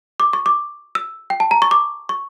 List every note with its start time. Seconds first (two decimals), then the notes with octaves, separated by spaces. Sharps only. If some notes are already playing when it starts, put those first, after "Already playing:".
0.20 D6
0.33 C#6
0.46 D6
0.95 E6
1.30 G5
1.40 A5
1.51 A#5
1.62 C#6
1.71 D6
2.09 C#6